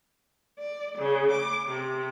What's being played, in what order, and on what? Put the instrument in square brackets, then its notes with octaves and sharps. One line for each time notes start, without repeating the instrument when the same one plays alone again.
[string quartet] D5
C#3
D6
C3